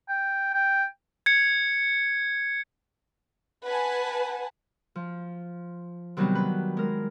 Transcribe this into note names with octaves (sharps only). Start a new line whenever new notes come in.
G5
G5
G#6 C#7
B4 F#5 G#5 A5
F3
C3 D#3 F#3 G3 B3 C4
B4
G#3 A#4